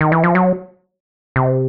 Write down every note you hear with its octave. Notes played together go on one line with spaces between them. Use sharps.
D#3
E3
F3
F#3
C3